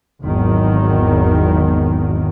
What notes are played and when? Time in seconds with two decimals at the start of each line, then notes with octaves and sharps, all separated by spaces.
0.23 G#1 E2 D#3 F#3